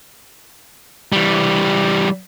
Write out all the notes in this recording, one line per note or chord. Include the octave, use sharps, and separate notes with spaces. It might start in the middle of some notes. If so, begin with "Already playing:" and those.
E3 G3